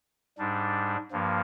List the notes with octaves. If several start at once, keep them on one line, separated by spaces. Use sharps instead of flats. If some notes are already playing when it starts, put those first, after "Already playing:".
G#2 G3 D4
G2 F3 A#3